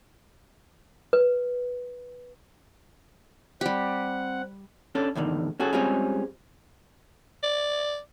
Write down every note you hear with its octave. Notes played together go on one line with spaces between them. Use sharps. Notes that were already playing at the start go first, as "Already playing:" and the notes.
B4
G3 C4 G4 F#5
C#4 D4 A4
E2 A2 D3 D#3
C#4 F#4 G#4 A4
G3 G#3 C4 C#4 F4 G#4
D5